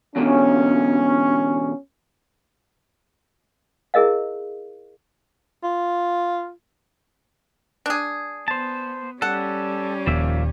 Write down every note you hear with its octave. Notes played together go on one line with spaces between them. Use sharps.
E2 B2 D3 C#4
E4 G#4 A#4 D#5 F5
F4
D4 G#4
B3 C5 A5
G3 C#4 A4 F#5
D#1 F3 A#3 E5